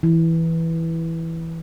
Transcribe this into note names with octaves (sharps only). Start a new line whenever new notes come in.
E3